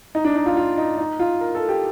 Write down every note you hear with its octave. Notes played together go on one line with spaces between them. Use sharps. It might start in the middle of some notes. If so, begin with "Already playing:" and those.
D#4
D4
D#4
F4
F4
D#4
D#4
F4
A#4
A4
G4